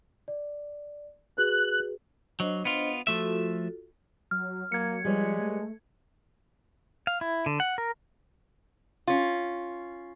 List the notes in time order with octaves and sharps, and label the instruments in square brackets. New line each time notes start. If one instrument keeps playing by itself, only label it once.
[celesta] D5
[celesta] F#4 G#4 B4 [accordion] F#6
[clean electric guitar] F#3 [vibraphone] D4 C5 D#5
[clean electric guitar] B3 F4
[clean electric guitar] F3 A3 E5 [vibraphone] F4 F#4 A4
[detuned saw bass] F#3 [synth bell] F6
[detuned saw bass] F#3 [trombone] A#3 [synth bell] G#6 C#7
[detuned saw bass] F3 [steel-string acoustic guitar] G3 B4 C#5 [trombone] G#3
[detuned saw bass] A3
[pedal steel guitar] F5
E4
D3
F#5
A#4
[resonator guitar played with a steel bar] C#4 F4